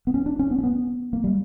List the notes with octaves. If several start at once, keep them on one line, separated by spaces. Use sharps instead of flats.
B3
C#4
D4
C#4
B3
C#4
B3
A#3
G3